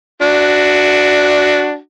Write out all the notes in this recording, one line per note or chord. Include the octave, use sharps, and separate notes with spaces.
D4 F#4